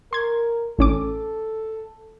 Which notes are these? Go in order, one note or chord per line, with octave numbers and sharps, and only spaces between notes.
A#4 C6 G#6
A1 C#4 A4 D6